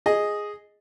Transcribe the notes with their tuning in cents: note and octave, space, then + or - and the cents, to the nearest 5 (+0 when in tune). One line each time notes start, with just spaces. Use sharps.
G#4 +0 D#5 +0